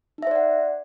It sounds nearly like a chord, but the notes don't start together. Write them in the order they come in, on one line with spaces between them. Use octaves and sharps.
D#4 E5 C5 D5 F#5